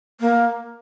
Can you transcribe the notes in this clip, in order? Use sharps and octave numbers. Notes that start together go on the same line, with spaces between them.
A#3